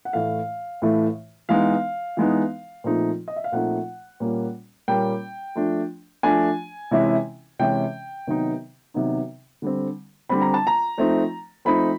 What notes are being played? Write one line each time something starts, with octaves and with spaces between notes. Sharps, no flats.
F#5
A2 E3 A3 F5
A2 E3 A3
E3 G#3 B3 D#4 F5
E3 G#3 B3 D#4
A#2 F3 A3 C4 D#4
D#5
E5
F5
A#2 F3 A3 C4 D#4 F#5
A#2 G3 A#3 C#4
A#2 G3 A#3 C#4 G5
F3 A3 D4
F3 A3 D4 G#5
C3 E3 G#3 C#4 E4
C3 E3 G#3 C#4 E4 G5
C3 D#3 F#3 B3 D#4
C3 D#3 F#3 B3 D#4
D3 G3 C4
D3 G3 C4 B5
A#5
A5
A#5
F3 A3 C4 D#4
F3 A3 C4 D#4 B5